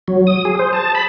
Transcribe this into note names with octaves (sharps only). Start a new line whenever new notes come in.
F#3
D#6
G#4
C5
A5
B5